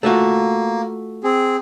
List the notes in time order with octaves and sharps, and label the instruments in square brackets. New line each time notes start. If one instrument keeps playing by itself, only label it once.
[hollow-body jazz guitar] A3 F4 F#4 [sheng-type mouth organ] A#3
[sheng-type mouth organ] C4 G#4